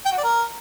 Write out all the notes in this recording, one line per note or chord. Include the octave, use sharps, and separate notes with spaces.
G5
F#4
D5
A#4